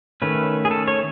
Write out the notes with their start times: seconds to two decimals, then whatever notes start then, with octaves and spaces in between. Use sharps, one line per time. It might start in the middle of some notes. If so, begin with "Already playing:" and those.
0.22 D#3 A3 C#4 B4
0.65 G#4
0.71 A4
0.88 C#5